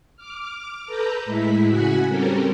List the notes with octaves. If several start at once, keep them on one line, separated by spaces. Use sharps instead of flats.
D6 F6
A4 B4 A#5 G6
A2 G#3 E4 B6
C#3 F#4 F#5 G#5 F#6 B6
G3 C4 C#4 A4 A#4